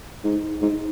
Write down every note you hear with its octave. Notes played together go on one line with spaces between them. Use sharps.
G#2
G#2